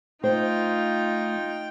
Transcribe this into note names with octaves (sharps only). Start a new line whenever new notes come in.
A3 D#4 F4 C5 G5